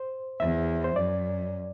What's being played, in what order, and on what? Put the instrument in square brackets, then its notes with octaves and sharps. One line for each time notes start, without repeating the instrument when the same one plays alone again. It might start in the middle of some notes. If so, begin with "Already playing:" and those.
Already playing: [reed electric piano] C5
[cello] E2 [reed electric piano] E5
[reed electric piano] C5
[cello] F#2 [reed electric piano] D5